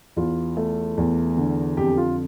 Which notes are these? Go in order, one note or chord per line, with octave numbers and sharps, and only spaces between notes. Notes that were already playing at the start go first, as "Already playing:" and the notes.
E2 F4
A3
E2
D3
F2 G4
F4